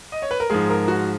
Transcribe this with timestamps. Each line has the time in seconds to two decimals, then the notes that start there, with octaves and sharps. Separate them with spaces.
0.12 D#5
0.22 C#5
0.31 B4
0.40 A#4
0.50 G#2 F3 G#3 G#4
0.70 A#4
0.88 F#4